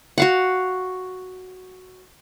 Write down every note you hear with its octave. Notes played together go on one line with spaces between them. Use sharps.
F#4 F5 F#5